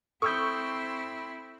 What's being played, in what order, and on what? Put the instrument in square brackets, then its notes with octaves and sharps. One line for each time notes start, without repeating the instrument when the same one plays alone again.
[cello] C4 E4 [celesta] A4 D#6 [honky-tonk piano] C#6 E6 G6